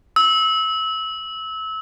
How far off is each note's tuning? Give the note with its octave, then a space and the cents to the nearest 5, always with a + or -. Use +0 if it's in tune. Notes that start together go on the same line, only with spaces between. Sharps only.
E6 -25